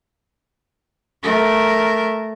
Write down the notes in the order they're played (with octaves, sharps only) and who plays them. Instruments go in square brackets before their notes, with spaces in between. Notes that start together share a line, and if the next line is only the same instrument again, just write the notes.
[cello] A3 A#4